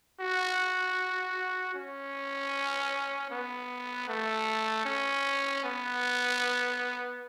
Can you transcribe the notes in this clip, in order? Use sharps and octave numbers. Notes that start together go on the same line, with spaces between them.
F#4
C#4
B3
A3
C#4
B3